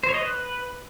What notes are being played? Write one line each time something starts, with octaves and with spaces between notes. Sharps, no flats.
C5
C#5
D#5
B4